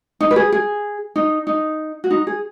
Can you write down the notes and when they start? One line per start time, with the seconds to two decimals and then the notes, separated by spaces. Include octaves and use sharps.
0.21 D#4
0.31 B4
0.36 G#4
0.52 G#4
1.16 D#4
1.47 D#4
2.04 F#4
2.11 D#4
2.27 G#4